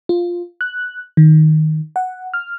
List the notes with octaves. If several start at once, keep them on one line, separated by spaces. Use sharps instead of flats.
F4
F#6
D#3
F#5
F6